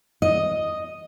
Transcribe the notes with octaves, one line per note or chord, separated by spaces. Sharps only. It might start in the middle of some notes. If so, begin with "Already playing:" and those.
D#5